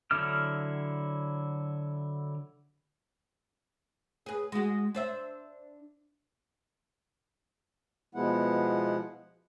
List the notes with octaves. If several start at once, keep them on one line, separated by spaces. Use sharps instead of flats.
D3 F#3 E4 D6 F6
G#4 B4
G#3 F#4
D4 C5 E5
B2 F3 G#3 B3 E4 F#5